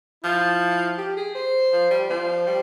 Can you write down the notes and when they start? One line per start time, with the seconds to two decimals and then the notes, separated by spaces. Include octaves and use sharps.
0.23 F3 E4
0.98 G4
1.16 G#4
1.35 C5
1.72 F3
1.90 G3
2.10 F3 C5
2.47 G3